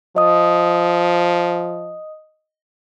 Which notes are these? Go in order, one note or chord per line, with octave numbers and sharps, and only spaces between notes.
F3 D#5 D#6